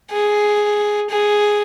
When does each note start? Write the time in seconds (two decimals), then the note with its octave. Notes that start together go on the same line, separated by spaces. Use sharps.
0.11 G#4
1.10 G#4